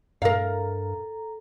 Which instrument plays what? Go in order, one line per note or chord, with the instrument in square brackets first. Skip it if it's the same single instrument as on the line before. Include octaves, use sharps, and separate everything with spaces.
[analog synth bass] G2 [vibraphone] A4 A#5 [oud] A#4 F5